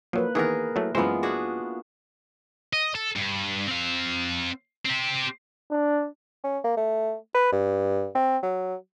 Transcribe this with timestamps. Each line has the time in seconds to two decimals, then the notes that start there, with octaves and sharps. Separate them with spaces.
0.13 F3 F#3 A#3 B4
0.35 D#3 E3 B3 G#4 A#4
0.76 F#3 A3 E4
0.95 F#2 E3 G#3 B3 F4 C5 F5
1.23 D4 F#4 G#4
2.73 D#5
2.95 A4
3.16 G2
3.68 C4 F5
4.85 C4 G4
5.71 D4
6.44 C#4
6.64 A#3
6.77 A3
7.34 B4
7.52 G2
8.15 C4
8.43 F#3